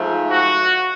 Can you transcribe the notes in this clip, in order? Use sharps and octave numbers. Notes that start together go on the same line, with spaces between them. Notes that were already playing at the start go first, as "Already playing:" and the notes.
Already playing: G#2 F3 A3
F#4